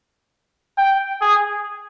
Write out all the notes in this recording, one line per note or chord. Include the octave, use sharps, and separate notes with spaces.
G5
G#4